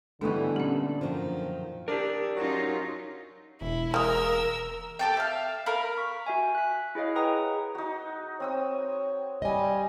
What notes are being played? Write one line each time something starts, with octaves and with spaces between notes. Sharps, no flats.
D3 E3 G3 A3 B3 D4 D#4 C#6
A#2 C#4 G4
F#2 D#3 F3
D4 G4 A#4
F#3 C#4 D#4 F4
E1 E4
G#3 A#3 A#4 E6
G4 A4 G5
E5 F5
A#4 F5 B5
C#6 B6
F#4 E5 G#5
F#6 B6
E4 G#4 C#5 D#5 F5
G#4 B4 F#5 G5 A#5 D#6
D#4 F#4
C4 C#5 D#6 E6
G3 D#5 G#5